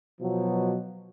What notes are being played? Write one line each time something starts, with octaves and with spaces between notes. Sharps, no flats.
B2 F3 F#3